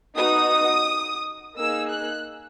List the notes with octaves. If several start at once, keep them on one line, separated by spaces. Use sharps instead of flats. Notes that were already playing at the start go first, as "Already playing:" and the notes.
B3 D#4 F#4 D#6
A#3 D#4 G#4 E6
F#6